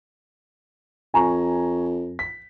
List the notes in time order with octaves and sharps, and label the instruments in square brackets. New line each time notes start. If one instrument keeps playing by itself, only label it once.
[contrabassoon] F2 [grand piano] G#5 A#5 C#6
[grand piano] B6